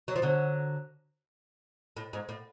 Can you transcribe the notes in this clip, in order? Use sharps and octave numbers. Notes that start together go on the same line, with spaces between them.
F#3
F3
D3 F#3
A2
G#2
A2